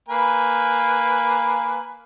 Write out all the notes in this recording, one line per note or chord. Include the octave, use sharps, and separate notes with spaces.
A#3 B4 G#5